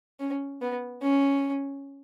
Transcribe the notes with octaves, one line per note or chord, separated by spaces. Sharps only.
C#4
B3
C#4